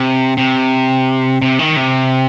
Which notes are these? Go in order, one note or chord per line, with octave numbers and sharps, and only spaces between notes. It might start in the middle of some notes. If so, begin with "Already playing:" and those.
Already playing: C3
C3
C3
D#3
C3